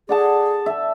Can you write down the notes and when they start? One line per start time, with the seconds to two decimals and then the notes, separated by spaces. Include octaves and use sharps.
0.09 G#4 D5 F#5 A5
0.66 E5 A5